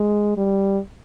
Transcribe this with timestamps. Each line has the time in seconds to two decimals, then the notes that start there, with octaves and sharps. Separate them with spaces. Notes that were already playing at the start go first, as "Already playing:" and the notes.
Already playing: G#3
0.37 G3